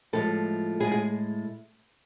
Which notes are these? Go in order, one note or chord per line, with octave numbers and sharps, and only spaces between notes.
A2 F3 G#3 A4
A2 G#3 G#4
G#4